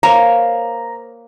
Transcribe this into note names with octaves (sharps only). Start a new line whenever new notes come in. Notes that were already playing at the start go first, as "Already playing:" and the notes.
A#3 C5 C#5 A#5